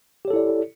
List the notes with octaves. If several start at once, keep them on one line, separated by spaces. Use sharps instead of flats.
E4 G4 A4 C#5 D5